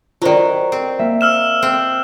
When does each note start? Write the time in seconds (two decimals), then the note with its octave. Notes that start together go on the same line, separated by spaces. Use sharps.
0.22 D#3 F#3 F4 C5 D5
0.72 C4
0.99 A#3 E5
1.21 E6 F6 E7
1.62 C4